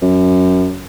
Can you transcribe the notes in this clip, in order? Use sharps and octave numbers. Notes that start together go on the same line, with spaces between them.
F#2